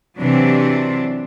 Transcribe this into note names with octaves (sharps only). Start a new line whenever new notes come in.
C3 E3 F#3 D4